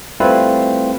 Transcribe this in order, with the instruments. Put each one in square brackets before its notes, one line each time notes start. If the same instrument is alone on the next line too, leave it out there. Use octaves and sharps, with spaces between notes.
[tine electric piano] G3 A3 C4 E4 F4 B4